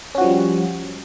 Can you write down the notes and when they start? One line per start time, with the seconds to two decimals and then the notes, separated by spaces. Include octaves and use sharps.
0.15 C#4
0.18 F#4
0.21 F3
0.24 G3